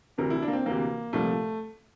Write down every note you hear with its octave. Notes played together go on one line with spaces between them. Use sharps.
D2 C3 E3 A#4
E4
D4
A#3
C4
D2 C3 E3 A#3
C2 A#2 F3 A3